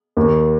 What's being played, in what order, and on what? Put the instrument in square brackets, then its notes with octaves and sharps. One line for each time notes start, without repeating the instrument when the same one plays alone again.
[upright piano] D#2